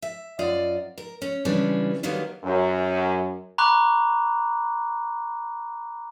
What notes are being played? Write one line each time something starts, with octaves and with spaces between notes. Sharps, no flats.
E5
F#2 F4 D5 D#5
A#4
C#4
C#3 E3 G3 G#3 C#4 D4
D3 D#3 F#3 G3 A#3 B3
F#2
A#5 B5 C#6 D6 F#6